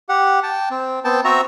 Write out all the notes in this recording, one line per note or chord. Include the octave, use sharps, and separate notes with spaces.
G4 F#5
G5 A5
C4
B3 C4 G5 A5
C4 F#4 E5 A#5